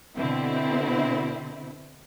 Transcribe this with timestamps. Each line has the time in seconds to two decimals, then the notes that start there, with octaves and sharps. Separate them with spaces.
0.16 B2 D3 C4 E4